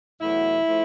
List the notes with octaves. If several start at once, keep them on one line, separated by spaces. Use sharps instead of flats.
E2 B2 F#3 A3 E4
F3 A3